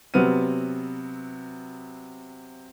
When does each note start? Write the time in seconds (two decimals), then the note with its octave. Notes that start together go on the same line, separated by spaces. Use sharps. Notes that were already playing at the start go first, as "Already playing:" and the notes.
0.14 C3 F#3 B3 C4 F6 D#7